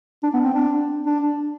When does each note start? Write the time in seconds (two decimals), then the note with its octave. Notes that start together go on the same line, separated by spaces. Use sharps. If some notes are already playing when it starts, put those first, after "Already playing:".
0.23 D4
0.34 B3
0.44 C4
0.54 D4
1.06 D4